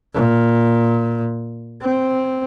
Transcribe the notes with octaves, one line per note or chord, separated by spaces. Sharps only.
A#2
C4